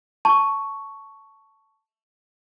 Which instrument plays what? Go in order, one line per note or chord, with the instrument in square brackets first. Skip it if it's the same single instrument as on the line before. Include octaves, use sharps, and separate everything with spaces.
[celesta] A5 C#6